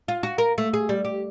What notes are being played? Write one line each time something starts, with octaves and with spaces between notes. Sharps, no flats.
F4
F#4
A#4
A3
G#4
G3
G4